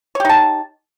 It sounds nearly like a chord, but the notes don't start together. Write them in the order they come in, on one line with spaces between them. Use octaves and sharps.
C#5 G4 D#4 A5